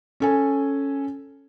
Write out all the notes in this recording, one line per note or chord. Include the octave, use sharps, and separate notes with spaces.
C#4 A4 G#5